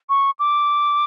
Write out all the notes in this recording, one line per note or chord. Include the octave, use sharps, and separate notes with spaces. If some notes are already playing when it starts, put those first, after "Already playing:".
C#6
D6